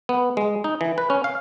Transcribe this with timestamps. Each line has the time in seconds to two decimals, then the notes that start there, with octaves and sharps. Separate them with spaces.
0.09 B3
0.37 G#3
0.64 D#4
0.81 E3
0.98 B4
1.10 C#4
1.24 F5